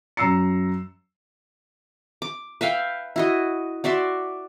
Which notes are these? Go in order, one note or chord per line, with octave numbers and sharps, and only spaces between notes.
F#2 A#5 E6 C7 C#7
D6
B4 E5 F5 G5
E4 F#4 D#5
F#4 D5 E5 C6